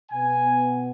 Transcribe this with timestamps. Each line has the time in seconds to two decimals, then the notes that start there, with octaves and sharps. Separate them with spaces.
0.11 B2 B3 G#5